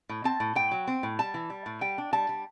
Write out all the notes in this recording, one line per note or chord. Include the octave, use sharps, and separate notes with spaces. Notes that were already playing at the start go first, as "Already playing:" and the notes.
A2
C4 A5
A2
A2 G5
F#3
C4
A2
G3 A5
E3
G3
A2
G3 G5
D4
G3 A5
G3